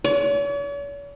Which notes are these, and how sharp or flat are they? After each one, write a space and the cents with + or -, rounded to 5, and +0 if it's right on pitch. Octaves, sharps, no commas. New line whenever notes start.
C#5 +45